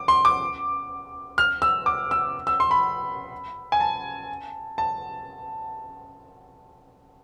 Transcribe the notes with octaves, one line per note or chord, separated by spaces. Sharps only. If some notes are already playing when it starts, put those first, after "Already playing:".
Already playing: D6
C6
D6
F6
E6
D6
E6
E6
C6
B5
G#5
A5
A5